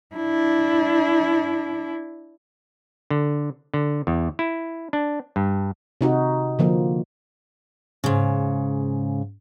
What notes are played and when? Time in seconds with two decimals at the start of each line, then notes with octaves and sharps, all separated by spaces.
0.16 D4 E4
3.10 D3
3.74 D3
4.07 E2
4.39 E4
4.93 D4
5.36 G2
6.01 C3 D#4 F#4
6.59 D3 F3 A#3
8.04 G#2 C#3